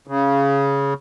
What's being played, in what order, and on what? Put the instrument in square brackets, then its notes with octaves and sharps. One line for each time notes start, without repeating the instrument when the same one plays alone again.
[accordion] C#3